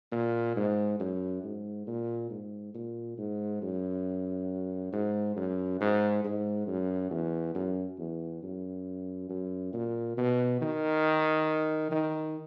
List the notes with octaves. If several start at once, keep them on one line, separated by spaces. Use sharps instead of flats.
A#2
G#2
F#2
G#2
A#2
G#2
A#2
G#2
F#2
G#2
F#2
G#2
G#2
F#2
E2
F#2
E2
F#2
F#2
A#2
B2
D#3
D#3